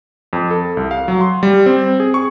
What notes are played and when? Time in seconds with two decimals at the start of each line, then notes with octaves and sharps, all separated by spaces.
0.33 F2
0.51 A4
0.77 C2
0.91 F5
1.08 F#3
1.21 C6
1.43 G3
1.66 C4
2.00 G#4
2.14 C#6